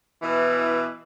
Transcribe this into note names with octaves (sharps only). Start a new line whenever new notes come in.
B2 E3